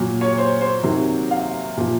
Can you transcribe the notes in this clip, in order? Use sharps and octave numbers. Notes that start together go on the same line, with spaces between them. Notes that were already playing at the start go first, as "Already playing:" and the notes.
Already playing: A#2 F#3
C#5
C5
C5
C3 D#3 F#3
F5
A#2 F3